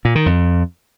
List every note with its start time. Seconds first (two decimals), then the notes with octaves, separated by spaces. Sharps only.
0.05 A#2
0.15 D#3
0.26 F2